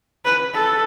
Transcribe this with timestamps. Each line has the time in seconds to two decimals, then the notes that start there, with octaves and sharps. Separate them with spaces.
0.25 B4
0.54 A4